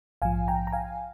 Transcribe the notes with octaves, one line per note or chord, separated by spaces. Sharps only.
A#1 G#2 F3 F5 G#5
G5 A#5
A#5
F5 G#5